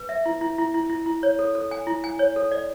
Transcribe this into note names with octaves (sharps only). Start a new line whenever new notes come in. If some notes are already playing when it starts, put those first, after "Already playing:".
Already playing: B4
E5
E4
E4
E4
E4
E4
E4
C#5
A4
A4
G#5
E4
G#5
C#5
A4
D5